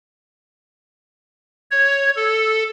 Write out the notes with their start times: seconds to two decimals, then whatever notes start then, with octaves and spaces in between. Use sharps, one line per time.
1.71 C#5
2.16 A4